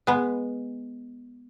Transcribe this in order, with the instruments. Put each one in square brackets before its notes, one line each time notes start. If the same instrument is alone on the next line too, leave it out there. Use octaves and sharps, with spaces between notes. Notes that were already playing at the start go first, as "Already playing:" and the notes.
[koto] G#3 B3